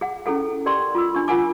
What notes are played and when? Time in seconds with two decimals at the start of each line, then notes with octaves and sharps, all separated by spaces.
0.01 G#4 F#5
0.26 C#4 E4 G#4 A4 F#5
0.66 G4 A#4 D5 G5 C6 C#6
0.95 F4 D6 E6
1.14 D4 C#6
1.28 F4 A#4 F#5 G#5 D6